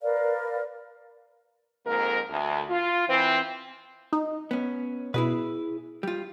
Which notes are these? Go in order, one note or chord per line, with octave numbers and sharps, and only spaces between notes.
A#4 B4 D5 F5
F2 G#2 A#3 A#4
D2
F4
E3 C4
D#4
B3 C#4
B2 E4 G#4 B4
G3 F4